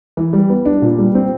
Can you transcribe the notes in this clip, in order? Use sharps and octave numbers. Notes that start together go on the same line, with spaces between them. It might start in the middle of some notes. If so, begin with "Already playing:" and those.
E3
G3
B3
D4
A#2
G3
C4